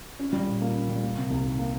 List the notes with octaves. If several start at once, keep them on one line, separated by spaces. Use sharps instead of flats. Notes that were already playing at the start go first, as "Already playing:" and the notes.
C#4
G3
A#2
A#3
C#4
G3
A#3
C3
C2
D#3
A#3